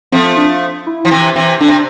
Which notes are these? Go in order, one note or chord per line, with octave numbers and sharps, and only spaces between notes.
F3 A3 C4
D4
E4
F3
C3 E3
C3 E3
D3 D4
C3